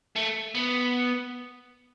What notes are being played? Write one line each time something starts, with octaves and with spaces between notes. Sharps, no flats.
A3
B3